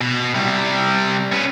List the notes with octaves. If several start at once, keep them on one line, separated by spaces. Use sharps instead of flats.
B2
C3 G3
C#4 B4